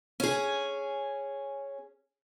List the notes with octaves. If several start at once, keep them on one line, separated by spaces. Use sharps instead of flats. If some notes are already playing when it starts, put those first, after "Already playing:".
C#4 G#4